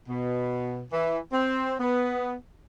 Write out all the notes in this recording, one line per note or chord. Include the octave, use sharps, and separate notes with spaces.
B2
E3
C4
B3